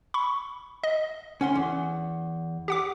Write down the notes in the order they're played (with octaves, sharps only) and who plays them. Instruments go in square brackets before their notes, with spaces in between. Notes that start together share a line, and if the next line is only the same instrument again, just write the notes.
[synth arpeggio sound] B5 C#6
D#5
[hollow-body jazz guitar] C#4 F#5 C6
E2
[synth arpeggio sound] G4 F#5 D6